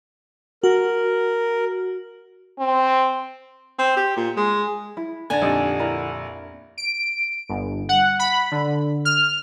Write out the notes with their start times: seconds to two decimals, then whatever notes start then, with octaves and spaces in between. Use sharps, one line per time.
0.63 F#4 A#4
2.59 C4
3.79 C4
3.97 G4
4.16 A#2
4.36 G#3
4.97 E4
5.30 F2 D3 D4 G#5 G#6 A6
5.42 A#1 A#3 C4 D#4 G4 D5 D#5
5.79 D4 E4 A#4
6.78 D7
7.49 G1
7.89 F#5
8.19 B5
8.51 D3
9.05 F6